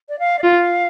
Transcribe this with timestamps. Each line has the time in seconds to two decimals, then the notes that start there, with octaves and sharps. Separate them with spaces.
0.09 D5
0.19 F5
0.39 D5
0.44 F4 F5